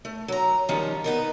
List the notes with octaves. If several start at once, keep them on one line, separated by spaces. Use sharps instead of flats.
A3
F#3 A#5
D#3 F3 G3 C#4
B3 D#4 A#4